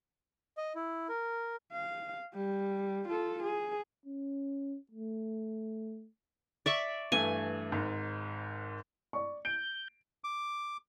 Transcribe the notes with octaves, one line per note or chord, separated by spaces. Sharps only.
D#5
E4
A#4
F5
G3
F4 A4
G#4
C#4
A3
D5 E5 C#6
G2 E3 A3 G#5
G#1 G#2
D5 C#6
G6 D7
D6